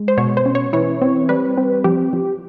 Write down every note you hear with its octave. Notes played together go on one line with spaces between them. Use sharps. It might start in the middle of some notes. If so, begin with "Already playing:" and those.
Already playing: G#3
C5
B2 C#5
C5
C#4
C#5
E3 C#5
C4
G3 B4
C4
F3 G4
F3